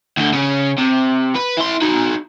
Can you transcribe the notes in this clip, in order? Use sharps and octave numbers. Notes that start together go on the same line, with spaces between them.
D2 D3
C#3 C#4
C3
B4
E4 C6
D#4 F#4